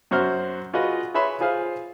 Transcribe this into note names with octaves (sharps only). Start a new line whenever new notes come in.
F#2 F#4 C5 F6
F4 F#4 G#4 B4 D#5
G#4 B4 C#5 E5 B5 C6
F4 G#4 C5 F5